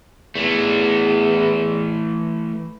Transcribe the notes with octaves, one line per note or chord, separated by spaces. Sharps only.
E2 E3 A3